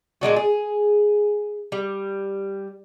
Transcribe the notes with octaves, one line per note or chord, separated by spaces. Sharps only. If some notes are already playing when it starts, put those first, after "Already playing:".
A#2 G#3 D4 F#4
G#4
G3